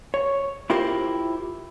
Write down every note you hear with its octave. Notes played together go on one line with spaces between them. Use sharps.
C#5
E4 F4 G4 A#4 C5